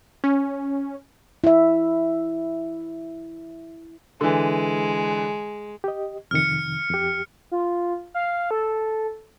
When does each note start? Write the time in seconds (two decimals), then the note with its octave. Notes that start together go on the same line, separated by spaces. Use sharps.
0.24 C#4
1.44 E4 E5
4.21 D3 E3 G#3
5.84 G4 D#5
6.31 F2 C3 D#3 F6 C#7
6.90 F2 G4
7.51 F4
8.14 F5
8.51 A4